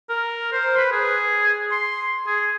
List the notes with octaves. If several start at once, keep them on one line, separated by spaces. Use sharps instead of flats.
A#4
C5
B4
G#4
C6
G#4